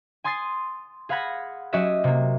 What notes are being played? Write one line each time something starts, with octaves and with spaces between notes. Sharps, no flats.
G#5 C6 D#6 A6 C7
G#4 F5 F#5 B5 G#6 A#6
F#3 C#4 F#4 G4 D#5 E5
C3 A#3